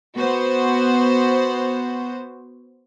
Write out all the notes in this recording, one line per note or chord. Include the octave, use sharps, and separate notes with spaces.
B3 F#4 C5